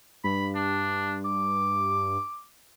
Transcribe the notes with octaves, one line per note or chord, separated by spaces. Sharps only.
G2 B5
D4
D6